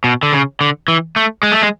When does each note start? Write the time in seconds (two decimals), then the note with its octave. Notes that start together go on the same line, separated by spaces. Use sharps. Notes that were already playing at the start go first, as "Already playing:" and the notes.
0.04 B2
0.23 D3
0.33 C#3
0.61 D3
0.88 E3
1.16 A3
1.43 G#3
1.52 A3
1.62 G#3